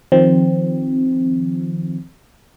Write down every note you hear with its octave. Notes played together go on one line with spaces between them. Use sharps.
D#3 F3 C4